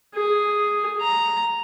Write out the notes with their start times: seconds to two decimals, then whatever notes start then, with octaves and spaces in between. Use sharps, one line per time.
0.15 G#4
1.01 A#5